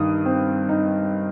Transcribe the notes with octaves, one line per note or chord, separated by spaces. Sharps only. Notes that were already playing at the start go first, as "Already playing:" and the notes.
Already playing: G2 D#3 D#6
C4
D#4